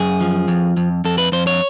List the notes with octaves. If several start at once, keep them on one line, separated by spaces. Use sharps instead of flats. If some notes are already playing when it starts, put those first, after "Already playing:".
Already playing: F#2 G#4
F3
F2
F2
F2 A4
B4
F2 C5
C#5